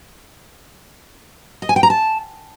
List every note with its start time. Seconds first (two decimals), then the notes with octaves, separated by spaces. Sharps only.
1.62 D#5
1.69 G#5
1.76 G5
1.83 A#5
1.90 A5